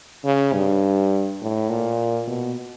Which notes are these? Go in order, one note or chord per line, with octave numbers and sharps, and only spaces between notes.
C#3
G2
A2
A#2
B2